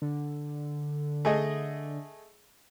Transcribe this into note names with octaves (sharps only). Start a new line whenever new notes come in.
D3
A3 G#4 D#5